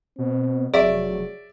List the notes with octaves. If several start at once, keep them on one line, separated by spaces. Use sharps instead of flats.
B2 C4
F1 F#3 G#4 D5 E5